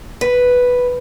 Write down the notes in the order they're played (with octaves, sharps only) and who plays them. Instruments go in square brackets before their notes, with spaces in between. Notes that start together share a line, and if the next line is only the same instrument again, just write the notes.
[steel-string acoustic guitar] B4